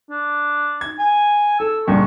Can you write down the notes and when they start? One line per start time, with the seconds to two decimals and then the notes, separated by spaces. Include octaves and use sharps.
0.10 D4
0.81 G#6
0.99 G#5
1.60 A4 E6
1.87 C#2 G2 A#2 C#6